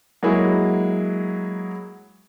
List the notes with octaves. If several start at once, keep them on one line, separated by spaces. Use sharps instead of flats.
F#3 G#3 A#3 E4 F#4 G#4